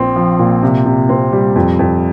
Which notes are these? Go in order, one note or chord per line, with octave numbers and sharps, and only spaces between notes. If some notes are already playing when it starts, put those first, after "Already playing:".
Already playing: A#1 C4
F3
A#2
C3
C3
C4
G3
F2
F2